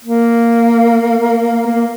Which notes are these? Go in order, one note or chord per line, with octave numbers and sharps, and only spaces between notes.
A#3
A#3